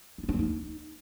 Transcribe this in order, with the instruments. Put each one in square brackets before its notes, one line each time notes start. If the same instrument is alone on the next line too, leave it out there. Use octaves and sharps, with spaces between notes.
[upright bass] D#4
F4
D4
C4
D#4